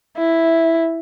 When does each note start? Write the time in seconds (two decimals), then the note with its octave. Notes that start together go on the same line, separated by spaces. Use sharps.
0.17 E4